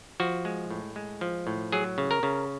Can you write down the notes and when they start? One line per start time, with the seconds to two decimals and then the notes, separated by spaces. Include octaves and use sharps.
0.20 F3 F#4
0.45 G#3
0.70 A2
0.96 G#3
1.21 F3
1.47 A2
1.72 F#3 G#4
1.98 C#3
2.11 A#4
2.23 C#3